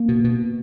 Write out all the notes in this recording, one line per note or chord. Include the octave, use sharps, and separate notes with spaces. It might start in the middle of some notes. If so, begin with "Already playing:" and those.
Already playing: A#3
B2
B2